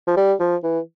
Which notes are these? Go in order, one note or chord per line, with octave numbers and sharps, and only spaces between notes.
F3
G3
F3
E3